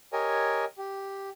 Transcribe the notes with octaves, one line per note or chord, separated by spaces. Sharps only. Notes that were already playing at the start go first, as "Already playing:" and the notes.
G4 A#4 C#5 D#5 G#5
G4